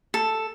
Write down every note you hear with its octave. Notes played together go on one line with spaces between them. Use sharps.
A4